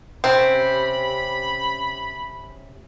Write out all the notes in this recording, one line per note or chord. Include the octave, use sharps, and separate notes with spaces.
C3 C4 C#4 G4 B5